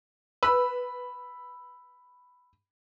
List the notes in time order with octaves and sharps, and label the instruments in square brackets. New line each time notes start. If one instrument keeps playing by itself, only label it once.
[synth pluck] B4 [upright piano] B5 E6